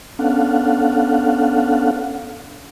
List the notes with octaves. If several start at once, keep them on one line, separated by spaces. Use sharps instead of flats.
B3 C#4 D4 A4 F5 F#5